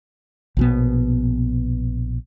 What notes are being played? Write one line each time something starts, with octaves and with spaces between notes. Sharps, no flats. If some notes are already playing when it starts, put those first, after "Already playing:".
A#1 B2 B3